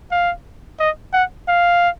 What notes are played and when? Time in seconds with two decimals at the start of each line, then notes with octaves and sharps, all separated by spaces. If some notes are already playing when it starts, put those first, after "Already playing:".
0.11 F5
0.80 D#5
1.13 F#5
1.48 F5